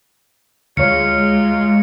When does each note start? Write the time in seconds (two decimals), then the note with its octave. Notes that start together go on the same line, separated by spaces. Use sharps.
0.77 D2 F#3 G#3 F4 C#5 C#7